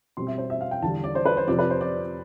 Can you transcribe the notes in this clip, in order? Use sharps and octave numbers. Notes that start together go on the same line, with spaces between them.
B2 G3 C4 C6
E5
C5
E5
F5
G5
E2 D3 G3 A5
D5
C5
B4
C5
F2 C3 F3 D5
B4
C5
D5